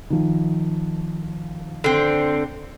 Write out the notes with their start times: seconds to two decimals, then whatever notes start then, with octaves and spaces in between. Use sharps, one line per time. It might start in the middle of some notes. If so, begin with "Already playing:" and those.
0.10 D#3 F3
1.84 D3 C4